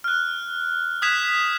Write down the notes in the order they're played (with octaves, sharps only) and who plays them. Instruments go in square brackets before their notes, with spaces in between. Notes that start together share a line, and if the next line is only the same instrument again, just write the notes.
[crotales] F6 F#6
D#6 F#6 G#6 B6 E7 F7